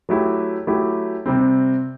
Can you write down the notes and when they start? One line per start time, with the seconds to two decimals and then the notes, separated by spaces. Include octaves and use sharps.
0.09 F#3 A3 E4 G4
0.67 F#3 A3 E4 G4
1.26 C3 G3 C4